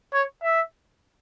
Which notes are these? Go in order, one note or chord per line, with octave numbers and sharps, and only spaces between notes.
C#5
E5